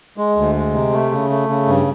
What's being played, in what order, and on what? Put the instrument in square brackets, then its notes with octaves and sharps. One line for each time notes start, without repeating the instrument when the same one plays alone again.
[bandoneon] G#3
D2
G#3
C3
A3
C#3
A3
C#3
G2